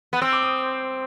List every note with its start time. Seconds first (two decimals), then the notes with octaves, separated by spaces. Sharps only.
0.13 B3
0.22 C4 E6
0.32 D6
0.43 D#6